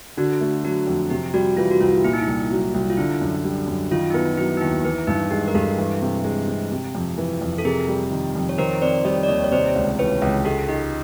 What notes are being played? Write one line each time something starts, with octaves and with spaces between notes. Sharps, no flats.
D3 F#4
A3
F#3 F#4
F2
C3 G4
G3 F#4
E3 F4
F#4
C2 F4
A#2 E4
D#4
C2 E4
F#3
C2
F4
D3 E4
F#2
G3
F#2
D#3 F4
D#4
B3 E4
F#3 E4
D#4
D#2 E4
E3 E4
G2 D#4
G#3 G4
A#4
G2 G4 A4
E3
C3
G#3
C3
C3
F2
E3
F2
A4
C3 G#4 A#4
G3
D#3
F2
C#5
D#3 A#4 C5
C4 C5 D5
G3 C#5 D#5
D5
D#2 C#5 D#5
C#5
C3 C5 D5
C#2
E3 B4 C#5
C#2
G#3 G4 A4
D#4 G4